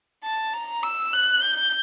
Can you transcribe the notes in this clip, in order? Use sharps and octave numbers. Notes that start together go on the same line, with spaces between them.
A5
A#5
E6
F#6
G6